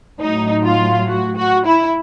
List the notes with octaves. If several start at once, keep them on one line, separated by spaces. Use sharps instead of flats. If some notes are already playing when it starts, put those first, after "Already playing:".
A2 F#3 D#4
F4
F#4
F#4
E4